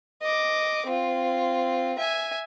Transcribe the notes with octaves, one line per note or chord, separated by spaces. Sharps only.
D#5 D6
C4 F4
E5 G#5